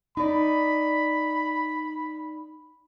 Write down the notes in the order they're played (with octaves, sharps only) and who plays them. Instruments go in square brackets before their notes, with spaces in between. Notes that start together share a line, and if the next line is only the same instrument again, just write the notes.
[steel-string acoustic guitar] D#4 D5 [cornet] B5